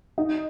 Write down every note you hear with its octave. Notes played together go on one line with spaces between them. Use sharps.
D#4